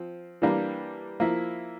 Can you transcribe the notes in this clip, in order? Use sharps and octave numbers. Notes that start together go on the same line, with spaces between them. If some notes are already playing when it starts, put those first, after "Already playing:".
Already playing: F3 C4
E3 G3 A#3 D4
F3 A#3 E4